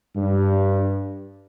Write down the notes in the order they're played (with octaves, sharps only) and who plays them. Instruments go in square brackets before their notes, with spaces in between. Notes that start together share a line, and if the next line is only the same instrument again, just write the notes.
[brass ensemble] G2